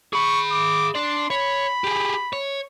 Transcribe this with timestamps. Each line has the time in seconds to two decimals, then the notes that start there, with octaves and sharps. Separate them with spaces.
0.13 G#4 B5 C#6
0.52 D6
0.95 D4 D5 C6
1.30 C#5 B5
1.84 G4 G#4
2.33 C#5